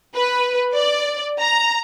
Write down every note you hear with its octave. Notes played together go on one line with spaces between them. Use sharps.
B4
D5
A#5